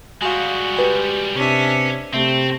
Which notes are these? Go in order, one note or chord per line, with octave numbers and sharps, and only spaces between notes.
G3 G#3 F#4 F5 G#5
G4 B4 G#5
C3 C#4 D4 E5
C3 A3 C4 E5